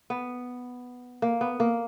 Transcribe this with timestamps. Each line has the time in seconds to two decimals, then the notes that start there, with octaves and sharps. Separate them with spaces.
0.10 B3
1.22 A#3
1.41 B3
1.60 A#3